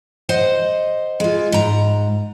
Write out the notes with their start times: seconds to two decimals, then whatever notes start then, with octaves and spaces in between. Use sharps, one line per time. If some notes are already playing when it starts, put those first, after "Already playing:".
0.29 C5 D#5 F#5
1.20 G#3 F4
1.52 G#2 A#5